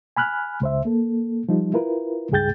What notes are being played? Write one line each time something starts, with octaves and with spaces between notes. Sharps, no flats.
G#5 B5 F6 F#6
C#2 C5 E5
A#3 A4
F3 G3 D#4
E4 F4 A#4 B4
C#2 G2 G#4 G5 G6 A6